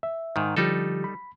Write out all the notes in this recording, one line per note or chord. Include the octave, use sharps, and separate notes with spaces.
E5
G#2 D#3
D3 F3 G3 D#4 G4 A4
B5